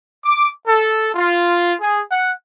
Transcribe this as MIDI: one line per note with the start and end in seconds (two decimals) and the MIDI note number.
0.25 0.50 86
0.66 1.11 69
1.15 1.74 65
1.81 1.99 68
2.10 2.31 78